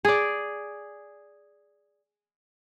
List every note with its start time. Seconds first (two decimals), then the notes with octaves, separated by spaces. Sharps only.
0.05 G#4 D5